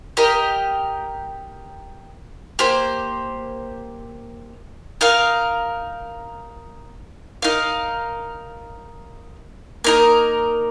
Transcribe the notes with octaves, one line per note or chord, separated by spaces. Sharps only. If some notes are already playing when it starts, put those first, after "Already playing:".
G4 A#4 D#5 G5
A#3 G4 C5
D#4 A#4 F5
D#4 A#4 F5
A#3 D#4 A#4